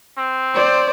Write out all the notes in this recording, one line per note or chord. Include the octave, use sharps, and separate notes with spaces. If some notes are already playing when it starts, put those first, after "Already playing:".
C4
C5 D5